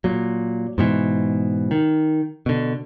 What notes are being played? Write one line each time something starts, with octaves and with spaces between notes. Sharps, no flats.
A#2 F#3
G#2 B2 E3
D#3
B2 D3